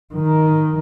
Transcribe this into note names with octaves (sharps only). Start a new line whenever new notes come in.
D#3